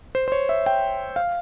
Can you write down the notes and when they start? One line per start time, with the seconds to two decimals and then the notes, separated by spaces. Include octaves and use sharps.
0.15 C5
0.28 C5
0.32 C#5
0.49 E5
0.66 G5
1.16 F5